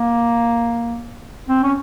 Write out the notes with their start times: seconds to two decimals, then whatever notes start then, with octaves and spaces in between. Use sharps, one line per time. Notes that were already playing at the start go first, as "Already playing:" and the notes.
Already playing: A#3
1.49 C4
1.63 C#4